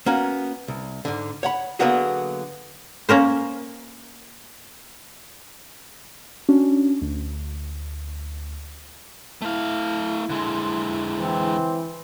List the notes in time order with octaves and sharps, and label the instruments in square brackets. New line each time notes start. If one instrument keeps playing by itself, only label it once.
[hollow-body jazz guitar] A#3 B3 C#4 F#4
C2
G#2 D3
C#5 F#5 B5
D3 F#3 A#3 B3 F#4 G#4
[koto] A#3 C#4 A#4 C5
[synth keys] C#4 D4 F#4
D2
[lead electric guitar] A3 F5 [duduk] E4
[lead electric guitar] D3 G#3 [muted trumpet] C6
[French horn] E3 [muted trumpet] C4